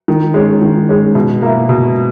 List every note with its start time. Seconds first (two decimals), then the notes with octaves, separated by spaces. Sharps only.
0.08 D#3
0.34 G#3 C#4
0.62 D#3
0.89 G#3 C#4
1.15 B2
1.42 A#3 E4
1.69 B2